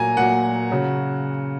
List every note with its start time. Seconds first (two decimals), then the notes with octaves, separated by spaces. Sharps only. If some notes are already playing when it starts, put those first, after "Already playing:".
Already playing: A#2 F#3 G#5 A#5
0.17 A#2 F#3 F#5
0.70 C#3 F#3